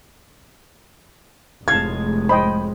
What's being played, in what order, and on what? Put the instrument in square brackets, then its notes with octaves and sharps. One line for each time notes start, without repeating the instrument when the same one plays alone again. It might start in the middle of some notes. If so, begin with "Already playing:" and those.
[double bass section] F1 A2 G#3 [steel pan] F5 A5 [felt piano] G#6
[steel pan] C5 D#5 G5 [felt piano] B5